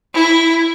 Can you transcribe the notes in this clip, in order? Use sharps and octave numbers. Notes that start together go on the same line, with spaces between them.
E4